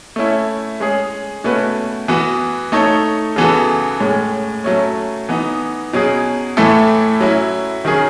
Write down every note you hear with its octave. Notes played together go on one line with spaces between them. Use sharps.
A3 C#4 E4
G#3 C#4 G#4 C#5
B2 A3 C#4 F#4 B4
E3 B3 F#4
A3 D#4 A4 C#5
C#3 E3 B3 F#4 A4
A2 G#3 C#4
F#3 A3 C#4
E3 B3 D#4
B2 F#3 C#4 G#4
A2 E3 A3 E4 A4
F#3 C#4 E4
D#3 F#3 C#4 G#4